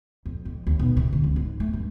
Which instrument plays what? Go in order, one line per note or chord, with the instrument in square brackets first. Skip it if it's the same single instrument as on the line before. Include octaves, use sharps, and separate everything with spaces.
[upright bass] F2
F2
D#2
B1
C3
D3
C#2
G#2
A3
G2